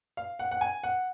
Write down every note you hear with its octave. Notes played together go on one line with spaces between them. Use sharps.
F5
F#5
F#5
G#5
F#5